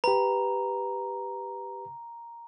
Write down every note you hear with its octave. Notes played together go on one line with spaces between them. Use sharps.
G4 B4 A#5